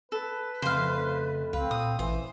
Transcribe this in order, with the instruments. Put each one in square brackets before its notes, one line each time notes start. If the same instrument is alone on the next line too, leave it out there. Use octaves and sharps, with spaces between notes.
[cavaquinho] A4 [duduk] B4
[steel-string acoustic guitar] F2 A3 [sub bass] C#3 [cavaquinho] C5 F5
[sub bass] C#2 [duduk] C4 [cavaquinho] B4 [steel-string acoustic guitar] F5
[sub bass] A#2 [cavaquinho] D#6
[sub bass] A1 [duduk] E3 [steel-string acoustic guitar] C5